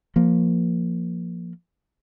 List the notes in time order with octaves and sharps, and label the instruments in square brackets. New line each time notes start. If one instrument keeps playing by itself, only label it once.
[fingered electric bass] F3 A#3